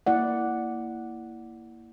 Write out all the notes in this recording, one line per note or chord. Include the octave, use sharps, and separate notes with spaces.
A#3 E4 D5 F#5